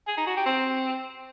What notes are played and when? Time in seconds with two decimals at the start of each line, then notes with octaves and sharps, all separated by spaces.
0.08 G#4
0.17 D#4
0.27 F#4
0.36 G4
0.46 C4